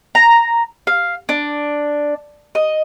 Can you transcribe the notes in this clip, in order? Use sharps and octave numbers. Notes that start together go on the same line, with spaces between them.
A#5
F5
D4
D#5